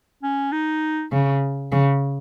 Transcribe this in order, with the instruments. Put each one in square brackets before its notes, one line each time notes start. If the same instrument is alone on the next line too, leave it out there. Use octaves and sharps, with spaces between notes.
[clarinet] C#4
D#4
[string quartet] C#3
C#3